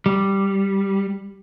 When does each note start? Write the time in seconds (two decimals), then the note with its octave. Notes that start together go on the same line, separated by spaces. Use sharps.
0.06 G3